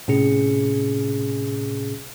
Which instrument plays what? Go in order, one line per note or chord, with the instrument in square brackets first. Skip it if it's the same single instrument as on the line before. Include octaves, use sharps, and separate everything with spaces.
[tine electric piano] A2 C3 C#4 G#4 C#7